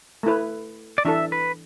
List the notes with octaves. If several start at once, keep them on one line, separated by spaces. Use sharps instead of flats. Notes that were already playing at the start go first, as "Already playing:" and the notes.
A3 E4 B4
D5
E3 D4 A4 E5
B4